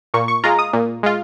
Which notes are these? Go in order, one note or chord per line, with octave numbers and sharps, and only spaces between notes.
A#2 C#6
C#6
G#3 F4 A#5
D#6
A#2
G#3 F4